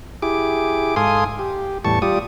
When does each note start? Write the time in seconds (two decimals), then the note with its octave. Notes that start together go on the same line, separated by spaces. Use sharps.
0.22 E4 G4 G#4 D6
0.96 G#2 A4 F5 G#5 C6 D#6
1.39 G4
1.85 E2 A2 G3 A5 C#6
2.02 G3 F4 G4 D5 D#6